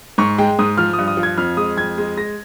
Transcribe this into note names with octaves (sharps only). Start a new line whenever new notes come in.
G#2 C#6
G#3 G5
G#2 D#6
F3 F6
D#6
G2
D#6
F3
G#6
F2 F6
G#3 D#6
F2 G#6
G#3
G#3 A#6